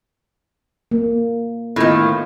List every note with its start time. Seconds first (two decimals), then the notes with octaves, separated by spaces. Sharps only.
0.91 A#3
1.76 A2 D#3 B3 F4